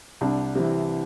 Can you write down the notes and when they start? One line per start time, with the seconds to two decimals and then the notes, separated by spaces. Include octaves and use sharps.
0.21 C2 D4
0.55 C3 E3